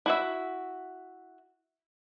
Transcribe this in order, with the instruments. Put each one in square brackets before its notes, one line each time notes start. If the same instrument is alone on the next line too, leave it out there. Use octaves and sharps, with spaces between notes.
[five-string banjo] E4 F#4 E5